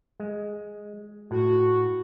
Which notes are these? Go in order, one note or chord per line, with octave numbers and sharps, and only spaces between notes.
G#3
A2 F#4